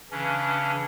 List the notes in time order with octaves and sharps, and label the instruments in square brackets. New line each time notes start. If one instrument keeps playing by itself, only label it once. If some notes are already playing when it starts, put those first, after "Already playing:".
[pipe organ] C#3 E3 C#4 D4